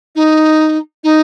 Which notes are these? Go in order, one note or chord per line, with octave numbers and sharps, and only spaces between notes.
D#4
D#4